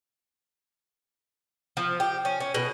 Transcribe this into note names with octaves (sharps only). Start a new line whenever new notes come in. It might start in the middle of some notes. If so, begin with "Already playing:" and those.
F3
G4
C#4
C#4
B2